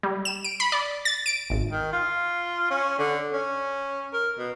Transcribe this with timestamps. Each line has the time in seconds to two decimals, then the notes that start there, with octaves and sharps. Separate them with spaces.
0.03 G3
0.25 E7
0.44 D7
0.60 B5
0.72 D5
1.05 A6
1.26 D7
1.50 G#1
1.71 D#3
1.93 F4
2.71 C#4
2.99 D3
3.33 C#4
4.14 A#4
4.39 B2